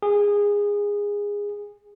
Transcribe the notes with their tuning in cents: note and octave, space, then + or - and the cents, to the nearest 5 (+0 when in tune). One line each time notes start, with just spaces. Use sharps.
G#4 -20